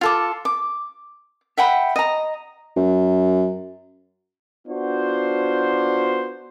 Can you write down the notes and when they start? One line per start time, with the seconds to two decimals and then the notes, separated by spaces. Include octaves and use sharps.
0.01 F4 A4 D6
0.45 D6
1.57 E5 F#5 G5 B5
1.96 D#5 A#5
2.76 F#2
4.67 B3 D4 F4 F#4 C5